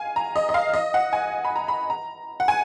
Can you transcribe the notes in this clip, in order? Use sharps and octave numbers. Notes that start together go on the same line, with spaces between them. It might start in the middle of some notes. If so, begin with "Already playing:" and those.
Already playing: F5 G#5
A#5
D#5
D#5
F5
D#5
F#5
G#5
B5
A#5
B5
A#5
F#5
G#5